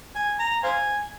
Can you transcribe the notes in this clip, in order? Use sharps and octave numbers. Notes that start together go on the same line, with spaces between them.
G#5
A#5
C5 F5 G#5